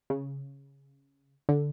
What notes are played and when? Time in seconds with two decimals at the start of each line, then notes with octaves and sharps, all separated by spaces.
0.10 C#3
1.49 D3